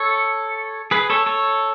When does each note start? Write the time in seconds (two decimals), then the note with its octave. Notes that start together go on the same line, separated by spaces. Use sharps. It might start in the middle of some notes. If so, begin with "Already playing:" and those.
Already playing: A4 C#5
0.91 G#4 B4
1.10 A4 C#5
1.26 A4 C#5